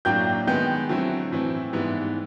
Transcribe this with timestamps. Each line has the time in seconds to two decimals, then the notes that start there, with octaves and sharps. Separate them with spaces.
0.05 A2 F#3 A#3 D4 G5 G6
0.47 D#3 G#3 B3 G5 G6
0.89 D3 F#3 A3 C4 E4
1.32 A2 E3 A3 C4 E4
1.73 G#2 E3 G3 B3 E4